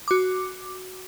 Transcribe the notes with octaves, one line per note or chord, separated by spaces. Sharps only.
F#4 D6